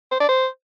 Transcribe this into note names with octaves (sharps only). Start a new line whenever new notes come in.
C5
D5
C5